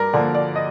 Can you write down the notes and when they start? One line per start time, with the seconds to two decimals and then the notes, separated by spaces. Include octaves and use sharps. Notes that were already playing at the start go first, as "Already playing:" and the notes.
Already playing: G2 A#4 D5
0.13 D3 F3 A#3 D5
0.34 D5
0.56 D#5